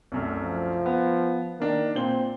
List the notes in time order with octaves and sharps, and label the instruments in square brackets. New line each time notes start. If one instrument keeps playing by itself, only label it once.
[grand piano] C2 F#2 A3
[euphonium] F3
[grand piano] B3
[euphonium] D#3 [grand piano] A#3 D4 A#4
[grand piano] A#2 C5 G7 [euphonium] C4